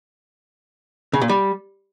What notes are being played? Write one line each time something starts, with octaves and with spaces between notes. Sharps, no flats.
C#3
A#2
G3